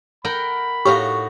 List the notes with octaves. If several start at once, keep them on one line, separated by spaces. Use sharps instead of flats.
A#4 F#5 G5 B5
A2 D#4 F#4 G4 C#5 F5 C#6